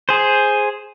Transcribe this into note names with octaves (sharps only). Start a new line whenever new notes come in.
G#4 C5